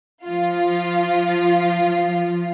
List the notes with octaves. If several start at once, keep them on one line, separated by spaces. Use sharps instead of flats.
F3 F4